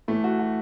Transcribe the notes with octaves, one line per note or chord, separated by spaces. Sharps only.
A2 E3 A3
F#4
F#4